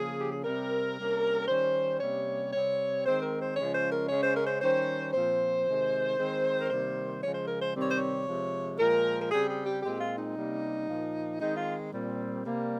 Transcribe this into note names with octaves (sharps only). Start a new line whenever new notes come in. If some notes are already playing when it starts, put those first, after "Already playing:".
Already playing: C#3 F3 A#3 C#4 G#4
G4
G#4
C3 G3 C4 A#4
C3 G3 A#3 C#4
D#3 G3 C#4 C5
C3 G3 A#3 C#4 C#5
C3 G3 C4 C#5
D#3 G#3 C4 C5
A#4
C5
C#3 F3 G#3 C#4 C#5
C5
A#4
C#3 G#3 C#4 C#5
C5
A#4
C5
D#3 G3 C#4 C5
A#2 F3 C4 C5
C3 D#3 G#3
D#3 G#3 C4
A#4
C3 D#3 G3 A#3 C5
C#3 F3 G#3 C#5
C5
A#4
C5
C3 D#3 G3 C4
C#5
C5
C#5
C3 F3 G#3
A#2 F3 G#3 A#4
A#4
C#3 G3 C4 G#4
G#4
G4
A#2 G#3 C4 G4
F4
D#4
C3 G3 A#3 C#4
A#2 F3 A#3
D#3 G#3 C4 D#4
F4
A#2 G3 C4
C3 G3 A#3